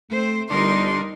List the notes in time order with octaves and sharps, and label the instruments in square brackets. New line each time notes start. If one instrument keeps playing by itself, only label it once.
[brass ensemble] A3 [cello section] C4 C5
[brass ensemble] G1 [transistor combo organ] D3 D4 [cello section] G3 D#4 A#4 [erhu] C6